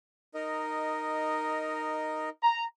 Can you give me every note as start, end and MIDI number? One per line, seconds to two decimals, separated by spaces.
0.34 2.29 63
0.34 2.29 70
0.34 2.29 75
2.43 2.65 82